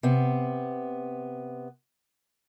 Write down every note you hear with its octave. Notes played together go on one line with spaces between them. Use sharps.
C3 B3